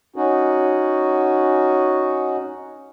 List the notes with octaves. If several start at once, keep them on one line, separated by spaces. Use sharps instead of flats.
C#4 D#4 F#4